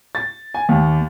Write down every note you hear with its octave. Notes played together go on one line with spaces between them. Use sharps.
A6
G#5
D#2